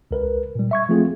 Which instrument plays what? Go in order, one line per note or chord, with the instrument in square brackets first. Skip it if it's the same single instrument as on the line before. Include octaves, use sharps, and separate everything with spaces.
[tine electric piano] C#2 A#4 B4
A#2 G3
E5 C#6 G#6
F3 A3 C4 F4 G#4